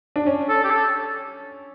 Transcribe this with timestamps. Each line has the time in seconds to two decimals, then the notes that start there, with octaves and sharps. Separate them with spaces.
0.16 D4
0.26 C#4
0.49 A4
0.64 G4
0.70 A4